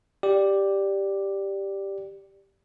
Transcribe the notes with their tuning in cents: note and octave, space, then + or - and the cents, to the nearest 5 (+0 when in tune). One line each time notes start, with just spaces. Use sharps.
G4 +0 D5 +0